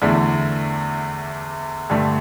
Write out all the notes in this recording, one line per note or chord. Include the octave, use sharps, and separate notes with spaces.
E2 D3 A3 E4
G2 D3 A3